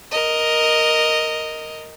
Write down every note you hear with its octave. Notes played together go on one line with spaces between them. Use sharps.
A#4 D#5